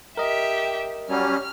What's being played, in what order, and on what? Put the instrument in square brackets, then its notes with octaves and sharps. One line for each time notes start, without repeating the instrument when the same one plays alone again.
[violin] G4 E5 [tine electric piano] A#4 D#5
[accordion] F#3 G3 C#4 [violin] F6